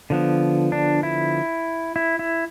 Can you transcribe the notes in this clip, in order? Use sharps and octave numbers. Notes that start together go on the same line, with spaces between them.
D3 F3 B3
D4
E4
E4
E4